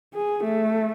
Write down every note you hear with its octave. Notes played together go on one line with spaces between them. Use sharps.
G#4
A3